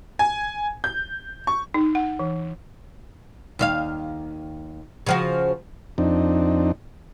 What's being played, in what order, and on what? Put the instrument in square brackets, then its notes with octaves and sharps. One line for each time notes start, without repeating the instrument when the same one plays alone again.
[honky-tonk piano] G#5
G6
C#6
[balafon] D#4
F#5
E3
[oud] D#2 E4 F5
C#3 F3 F#4
[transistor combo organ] F2 C4 D4 D#4